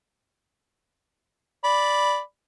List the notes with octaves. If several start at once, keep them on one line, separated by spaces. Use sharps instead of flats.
D5 B5